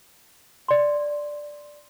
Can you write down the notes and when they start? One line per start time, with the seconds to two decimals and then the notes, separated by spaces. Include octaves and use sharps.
0.68 D5 C6